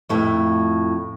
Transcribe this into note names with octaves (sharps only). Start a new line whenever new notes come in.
F2 A2 E5